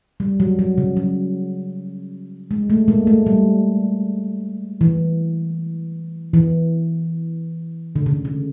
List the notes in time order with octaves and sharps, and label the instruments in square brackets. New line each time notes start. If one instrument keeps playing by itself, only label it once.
[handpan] G3
F#3
F#3
C#3
F#3
G#3
A3
G#3 A#3
A3
G3
E3
E3
D3
C#3
C#3